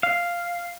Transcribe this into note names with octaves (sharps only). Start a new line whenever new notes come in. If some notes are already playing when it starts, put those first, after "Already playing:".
F5